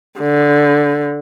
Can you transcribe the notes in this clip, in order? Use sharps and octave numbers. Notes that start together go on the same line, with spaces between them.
D3